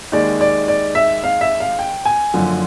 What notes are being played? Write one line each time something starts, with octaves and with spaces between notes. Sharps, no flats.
D#2 D#3 G#3 D5
D5
D5
E5
F5
E5
F5
G5
G#5
F#1 F#2 D3 F3